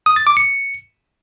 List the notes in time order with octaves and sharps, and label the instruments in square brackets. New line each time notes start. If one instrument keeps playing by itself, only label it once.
[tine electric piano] D#6
A6
D6
C#7